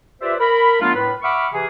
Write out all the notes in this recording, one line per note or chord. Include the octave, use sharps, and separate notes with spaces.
F4 G4 B4 C5 D5 E5
A#4 B5
F#3 A3 B3 D4 F4
A2 B4 B5
E5 F#5 B5 C#6 D6 F6
C3 E3 G#4